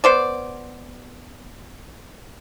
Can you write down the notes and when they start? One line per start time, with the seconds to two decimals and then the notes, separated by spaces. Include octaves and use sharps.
0.04 B3 C5 D5